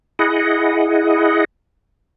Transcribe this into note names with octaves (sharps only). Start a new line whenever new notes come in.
E4 G#4 D#5 F#5